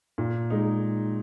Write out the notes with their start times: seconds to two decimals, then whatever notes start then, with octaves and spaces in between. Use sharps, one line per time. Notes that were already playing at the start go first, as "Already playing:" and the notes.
0.18 A#2
0.50 G#3 D#4